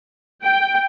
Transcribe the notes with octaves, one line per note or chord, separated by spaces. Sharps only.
G5